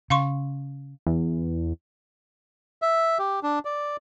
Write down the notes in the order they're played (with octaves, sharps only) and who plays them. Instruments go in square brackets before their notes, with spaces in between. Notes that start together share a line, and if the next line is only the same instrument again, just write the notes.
[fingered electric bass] C#3 [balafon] F5 C6 C#6
[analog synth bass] E2
[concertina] E5
G4
D4
D5